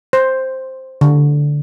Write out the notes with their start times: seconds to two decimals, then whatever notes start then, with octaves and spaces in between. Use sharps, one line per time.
0.13 C5
1.01 D3